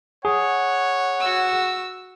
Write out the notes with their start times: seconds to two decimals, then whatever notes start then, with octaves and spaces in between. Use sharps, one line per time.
0.25 G#4 C#5 F#5
1.21 F#4 E6